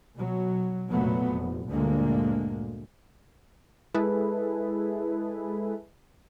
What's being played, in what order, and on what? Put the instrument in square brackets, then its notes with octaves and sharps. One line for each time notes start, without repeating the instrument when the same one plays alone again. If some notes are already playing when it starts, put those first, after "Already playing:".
[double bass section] B2 F#3
F1 A#2 F#3 A3 B3
F1
D2 G2 A#2 D3 G#3 A#3
[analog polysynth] G#3 E4 G#4 A4 B4